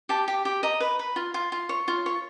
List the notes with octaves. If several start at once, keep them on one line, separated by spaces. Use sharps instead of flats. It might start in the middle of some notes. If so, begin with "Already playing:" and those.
G4 A5
G4
G4
D#5 A#5
B4
B4
F4
F4
F4
C#5
F4
C#5